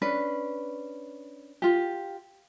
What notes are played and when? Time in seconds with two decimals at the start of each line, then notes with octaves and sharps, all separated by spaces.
0.02 C#4 D4 B4
1.62 F4 G4